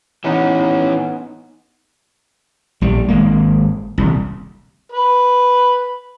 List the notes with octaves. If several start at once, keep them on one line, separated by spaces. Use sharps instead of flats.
E3 B3 C#4 D#4 F#5
A#1 G3
G#1 G#3 A#3
D#1 C2
B4